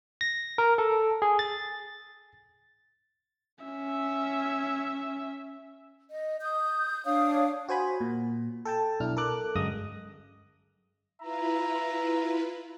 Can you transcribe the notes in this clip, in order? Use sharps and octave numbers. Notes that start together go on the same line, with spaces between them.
A#6
A#4
A4
G#4
A6
C#4 E5
D#5
D#6 G6
D4 C#5 F5 D#6
F#4 C5 G#5 B5
A#2
A4 G5 A5
B1 D4 E4 F6
A4 A#4 D6 F#6
G1 F#2 G#3 D#6 A#6
E4 F4 B4 E5 A#5